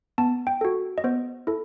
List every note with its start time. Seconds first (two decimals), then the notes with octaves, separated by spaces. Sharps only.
0.18 B3 A5
0.47 G5
0.61 F#4 A4
0.98 D#5
1.04 B3 C5
1.47 E4 A4